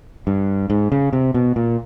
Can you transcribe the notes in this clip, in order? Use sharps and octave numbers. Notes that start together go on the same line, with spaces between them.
G2
G#2
C#3
C3
B2
A#2